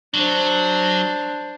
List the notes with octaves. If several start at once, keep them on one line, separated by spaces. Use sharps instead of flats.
F#3 D4 C5